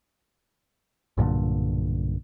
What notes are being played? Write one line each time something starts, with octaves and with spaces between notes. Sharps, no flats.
B1 G2 A#2 D3